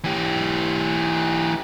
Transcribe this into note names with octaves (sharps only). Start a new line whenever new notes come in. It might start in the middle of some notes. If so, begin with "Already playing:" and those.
E3 G4